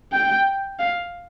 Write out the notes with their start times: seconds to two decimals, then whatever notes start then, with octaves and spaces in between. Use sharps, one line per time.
0.13 G5
0.79 F5